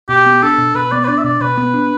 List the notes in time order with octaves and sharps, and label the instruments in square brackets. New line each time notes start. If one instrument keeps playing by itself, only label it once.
[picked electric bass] B2 [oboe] G4
[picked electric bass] B3
[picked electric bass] D4 [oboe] A4
[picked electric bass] B2
[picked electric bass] B2 [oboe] B4
[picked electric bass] B3 [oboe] D5
[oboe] B4
[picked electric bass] D4 [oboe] D5
[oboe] E5
[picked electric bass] B2 [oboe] D5
[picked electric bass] B2 [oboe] B4
[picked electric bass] B3
D4